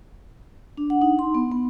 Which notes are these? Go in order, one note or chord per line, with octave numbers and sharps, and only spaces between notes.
D4
F#5
D#4
C6
B3
B3